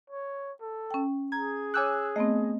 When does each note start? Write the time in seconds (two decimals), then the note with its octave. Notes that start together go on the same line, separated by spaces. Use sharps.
0.10 C#5
0.61 A4
0.91 C#4 G5
1.32 G#4 A#5 G#6
1.74 C#5 G#5 D6 E6 F#6 G6
2.16 A3 B3 C4 D#5